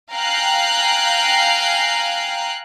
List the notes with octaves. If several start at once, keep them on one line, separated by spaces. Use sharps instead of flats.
F5 G5 G#5 A#5 F#6 C7